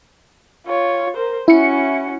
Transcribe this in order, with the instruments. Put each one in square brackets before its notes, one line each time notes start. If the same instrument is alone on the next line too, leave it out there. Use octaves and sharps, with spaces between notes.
[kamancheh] F4 C#5
A#4 C5
[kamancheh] C#4 F#4 [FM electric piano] E4 C#7